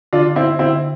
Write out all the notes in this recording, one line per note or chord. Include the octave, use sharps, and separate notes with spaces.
D3 D4 F4
C4 E4
D3 C4 E4